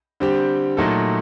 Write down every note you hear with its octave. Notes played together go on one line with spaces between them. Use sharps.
D3 G3 C4 G4
A#2 F#3 A3 D#4 A4